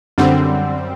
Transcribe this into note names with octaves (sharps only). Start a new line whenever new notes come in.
F#2 D3 G3 C4